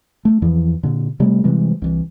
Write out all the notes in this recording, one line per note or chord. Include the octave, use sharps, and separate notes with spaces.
A3
E2 E3 F3
A#2 D3
C3 G3 A3
C3 E3 G3 G#3
C2 E3